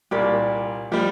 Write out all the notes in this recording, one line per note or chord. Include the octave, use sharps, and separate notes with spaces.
C2 A#2 G4 A#4 D5
F3 G3 G4 A#4 G5